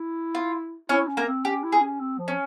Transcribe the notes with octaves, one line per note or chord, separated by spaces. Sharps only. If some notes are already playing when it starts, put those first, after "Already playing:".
Already playing: E4
F4
C#4 E4 C#5
C#4
A#3 A#4
C4
C#4 G4
E4
G#4
C#4
C4
F3
C#4